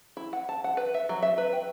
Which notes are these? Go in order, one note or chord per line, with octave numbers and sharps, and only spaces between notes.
E4
F#5
A5
F#5
B4
E5
F#3
E5
B4
G5